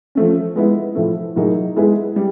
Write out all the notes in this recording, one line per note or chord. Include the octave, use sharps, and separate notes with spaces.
F3 A3 C#4
G#3 B3 E4
A2 F3 A3
A2 F#3 A#3 D#4 G#4
G#3 B3 E4 G#4 B4
G3